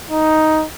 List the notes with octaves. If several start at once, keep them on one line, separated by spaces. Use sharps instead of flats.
D#4